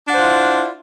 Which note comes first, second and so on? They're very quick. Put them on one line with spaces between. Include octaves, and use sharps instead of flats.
D4 F#5 C5 F4 E4